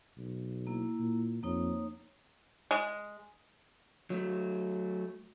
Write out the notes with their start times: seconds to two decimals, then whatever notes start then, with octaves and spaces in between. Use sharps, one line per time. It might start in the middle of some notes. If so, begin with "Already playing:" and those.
0.18 B1
0.67 A#3 E4
0.99 A#2
1.43 F2 A#3 D#4 C#5
2.71 G#3
4.10 F#3 A3